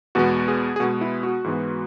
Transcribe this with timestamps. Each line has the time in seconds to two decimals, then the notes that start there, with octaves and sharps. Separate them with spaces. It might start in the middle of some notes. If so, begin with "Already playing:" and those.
0.15 E2 B2 G#3 B3 F#4
0.48 G#4
0.76 G#4
0.80 B2 G#3 B3 F#4
1.01 E4
1.23 F#4
1.44 G#2 E3 G#3 B3